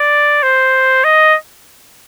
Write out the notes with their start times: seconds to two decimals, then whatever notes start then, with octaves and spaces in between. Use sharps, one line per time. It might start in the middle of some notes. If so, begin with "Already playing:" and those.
Already playing: D5
0.43 C5
1.04 D#5